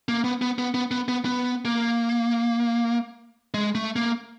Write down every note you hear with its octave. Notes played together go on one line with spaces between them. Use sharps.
A#3
B3
B3
B3
B3
B3
B3
B3
A#3
G#3
A3
A#3